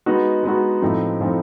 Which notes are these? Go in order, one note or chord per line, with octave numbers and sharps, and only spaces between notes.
G#3 B3 D#4 F#4
G#3 B3 D#4 F#4
A2 F3 A3 C4 D#4
A2 F3 A3 C4 D#4